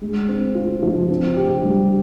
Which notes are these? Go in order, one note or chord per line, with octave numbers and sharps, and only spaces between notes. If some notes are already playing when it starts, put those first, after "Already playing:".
G#3
C4
F4
F3
C4
G4
G3